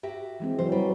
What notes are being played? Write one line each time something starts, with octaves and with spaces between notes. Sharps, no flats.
F#4 G4 E5
E3 G#3 C4
E3 F#3 C5
G3